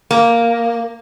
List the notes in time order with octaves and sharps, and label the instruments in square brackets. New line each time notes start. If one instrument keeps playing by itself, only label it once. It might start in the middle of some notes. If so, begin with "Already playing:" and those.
[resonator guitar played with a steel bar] A#3